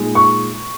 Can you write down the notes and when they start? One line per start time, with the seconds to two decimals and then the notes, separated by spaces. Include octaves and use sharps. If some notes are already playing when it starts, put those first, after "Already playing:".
Already playing: A#2 G#3 D#4
0.15 C#6